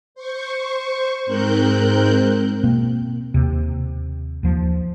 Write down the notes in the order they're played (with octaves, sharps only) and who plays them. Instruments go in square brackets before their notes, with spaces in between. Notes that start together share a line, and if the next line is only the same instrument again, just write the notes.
[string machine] C5 C#6
G#2 C4 A#4 F#6 G6
[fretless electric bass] B2 A#3 C4
D#2 C3
D#2 F3